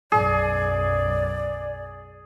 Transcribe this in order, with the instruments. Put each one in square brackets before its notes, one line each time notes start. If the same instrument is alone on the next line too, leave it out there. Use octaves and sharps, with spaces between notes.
[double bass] B1 F#2 [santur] G#4 [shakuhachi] D5